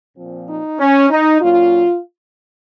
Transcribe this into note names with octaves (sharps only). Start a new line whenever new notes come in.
A#2 F3 C4
D#4
C#4
D#4
A#2 F#3 A#3 C#4 F4